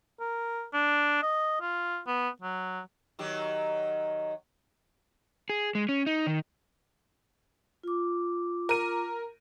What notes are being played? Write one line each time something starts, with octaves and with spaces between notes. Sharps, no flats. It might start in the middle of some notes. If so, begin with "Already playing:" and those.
A#4
D4
D#5
F4
B3
F#3
D#3 F#3 G4
G#4
G#3
C#4
D#4
D#3
F4 D6
A#4 D#7